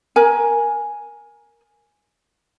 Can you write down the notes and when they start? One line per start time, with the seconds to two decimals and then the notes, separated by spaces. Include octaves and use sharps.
0.16 A#4 G#5